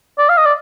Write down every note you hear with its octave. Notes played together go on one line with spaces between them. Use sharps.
D5
F5
D#5
D5